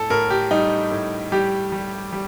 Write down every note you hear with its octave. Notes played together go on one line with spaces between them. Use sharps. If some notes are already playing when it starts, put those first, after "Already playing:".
Already playing: A2 A4
A2 A#4
G4
G3 D#4
A2
G3 G4
G3
G3